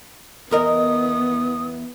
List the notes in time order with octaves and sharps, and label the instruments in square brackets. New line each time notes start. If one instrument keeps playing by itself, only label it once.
[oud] E2 A#4 D#5 [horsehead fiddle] B3 [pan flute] D#6